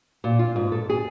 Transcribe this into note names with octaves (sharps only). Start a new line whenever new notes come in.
A#2
F4
G#2
A4
G#4